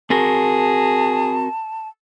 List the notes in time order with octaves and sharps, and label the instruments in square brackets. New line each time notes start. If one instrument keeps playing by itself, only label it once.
[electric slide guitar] C4 F#4 A#4 [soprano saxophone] G#4 [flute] A5